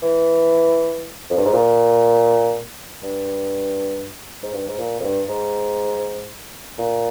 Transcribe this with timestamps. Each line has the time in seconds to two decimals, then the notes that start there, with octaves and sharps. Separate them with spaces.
0.02 E3
1.30 F2
1.37 G2
1.45 G#2
1.53 A#2
3.03 G2
4.43 G#2
4.53 G2
4.68 G#2
4.78 A#2
5.00 F2
5.03 G2
5.29 G#2
6.79 A#2